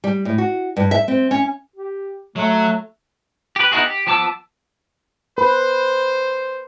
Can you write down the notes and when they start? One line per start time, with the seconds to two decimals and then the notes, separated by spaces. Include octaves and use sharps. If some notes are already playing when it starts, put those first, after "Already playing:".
0.04 G3
0.25 A2
0.38 F#4
0.77 G2
0.91 E5
1.08 C4
1.31 C#4
1.76 G4
2.36 F#3 A3
3.56 G4 B4
3.72 B3 D#4 E4 F#4 G#4
3.84 G4
4.07 F3 B3 A5 D6 E6
5.38 B4 C5